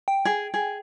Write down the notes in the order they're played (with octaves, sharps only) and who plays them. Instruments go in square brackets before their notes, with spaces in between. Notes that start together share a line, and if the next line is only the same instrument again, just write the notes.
[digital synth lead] G5
[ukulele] G#4
G#4